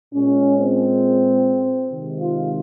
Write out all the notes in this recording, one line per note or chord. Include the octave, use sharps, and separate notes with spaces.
A#2 G#3 C#4
C4
C3 D#3 G#3
F4